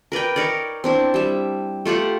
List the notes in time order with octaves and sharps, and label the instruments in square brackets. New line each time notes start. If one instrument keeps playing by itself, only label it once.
[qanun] A#4 B4 D5 G5
D#4 A#4 C#5 D5
C4 D4 E4
G3 E5
A3 F4 G4 F#5